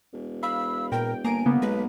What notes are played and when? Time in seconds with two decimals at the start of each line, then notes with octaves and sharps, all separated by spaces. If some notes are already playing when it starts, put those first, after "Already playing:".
0.12 E1
0.43 F5 B5 E6
0.92 A#2 A#4 G5
1.25 G1 A#3 G#5 A#5 D7
1.46 C#3 A#3 B3
1.62 B1 G#3 B4